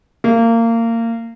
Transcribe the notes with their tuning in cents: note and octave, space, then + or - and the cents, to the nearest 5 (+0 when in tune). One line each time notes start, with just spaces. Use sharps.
A#3 -25